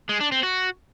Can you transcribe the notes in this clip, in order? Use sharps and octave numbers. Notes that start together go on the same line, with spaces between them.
G#3
D4
C4
F#4